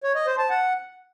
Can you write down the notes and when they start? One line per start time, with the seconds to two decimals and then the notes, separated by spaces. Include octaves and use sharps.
0.04 C#5
0.15 D#5
0.27 C5
0.38 A5
0.50 F#5